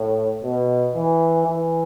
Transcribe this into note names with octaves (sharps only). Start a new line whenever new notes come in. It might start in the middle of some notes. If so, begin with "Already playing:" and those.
Already playing: A2
B2
E3
E3